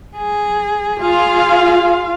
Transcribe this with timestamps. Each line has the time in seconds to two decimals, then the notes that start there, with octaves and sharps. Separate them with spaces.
0.17 G#4
1.01 F4 G#4 F5